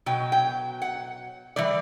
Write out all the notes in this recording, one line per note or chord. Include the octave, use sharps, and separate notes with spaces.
B2 F#3 G5
G5
F#5
E3 G3 D5